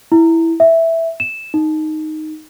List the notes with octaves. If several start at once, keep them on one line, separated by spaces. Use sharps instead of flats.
E4
E5
E7
D#4